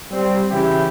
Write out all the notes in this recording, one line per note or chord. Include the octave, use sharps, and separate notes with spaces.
G3 C4
C#3 E3 E4 G4